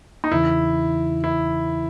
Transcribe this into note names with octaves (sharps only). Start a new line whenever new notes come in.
D#4
E2 C#3 E3 E4
E4